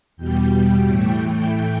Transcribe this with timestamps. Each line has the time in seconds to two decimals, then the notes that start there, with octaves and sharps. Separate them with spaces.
0.17 E2 B2 G3 G5
0.84 A2 E3 A3